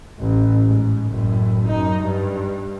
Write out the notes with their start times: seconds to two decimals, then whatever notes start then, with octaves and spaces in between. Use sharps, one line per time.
0.18 A1
0.66 G#2
1.07 F#1 A2
1.67 F#2 D#4
2.02 G2